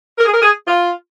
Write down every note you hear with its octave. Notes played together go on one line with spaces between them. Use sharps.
A#4
G#4
A#4
G#4
F4